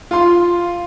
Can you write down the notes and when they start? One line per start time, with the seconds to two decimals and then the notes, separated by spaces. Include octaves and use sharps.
0.11 F4 C6